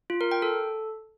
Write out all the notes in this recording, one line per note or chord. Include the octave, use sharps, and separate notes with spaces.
F4
A#4
G5
A4